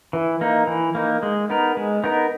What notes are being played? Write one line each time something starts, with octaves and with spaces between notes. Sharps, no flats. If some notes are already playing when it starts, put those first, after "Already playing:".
E3
A#3 D#4
E3
A#3 D#4
G#3
B3 D#4 A#4
G#3
B3 D#4 A#4